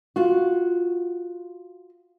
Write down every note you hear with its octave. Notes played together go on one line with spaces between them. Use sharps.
F4 F#4